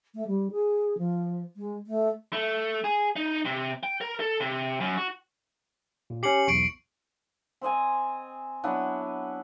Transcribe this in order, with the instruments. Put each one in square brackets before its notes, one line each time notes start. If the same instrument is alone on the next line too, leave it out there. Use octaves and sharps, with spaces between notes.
[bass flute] A3
G3
G#4
F3
G#3
A3
[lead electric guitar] A3
G#4
D#4
C3
G5
A#4
A4
C3
F#2
F#4
[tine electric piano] A#2
[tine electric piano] C#4 G4 [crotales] C7 C#7 F#7
[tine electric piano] B1 E2 [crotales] C#6 C7 D7
[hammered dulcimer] C4 C5 D#5 G#5
F#3 B3 D4 E4